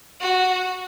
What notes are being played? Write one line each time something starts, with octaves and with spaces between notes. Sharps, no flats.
F#4